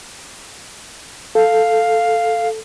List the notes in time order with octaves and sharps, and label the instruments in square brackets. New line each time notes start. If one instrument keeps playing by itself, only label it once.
[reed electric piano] A4 [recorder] F5